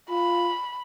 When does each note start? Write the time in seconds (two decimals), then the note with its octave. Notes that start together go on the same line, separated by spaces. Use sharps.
0.10 F4 B5